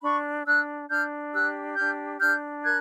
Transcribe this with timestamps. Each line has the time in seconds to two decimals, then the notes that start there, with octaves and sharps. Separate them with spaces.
0.03 D4 B5 C#6
0.46 D4 E6 F#6
0.90 D4 F6 G6
1.33 G4 E6 F#6
1.77 D4 F6 G6
2.21 D4 F6 G6
2.64 A#4 F#6 G#6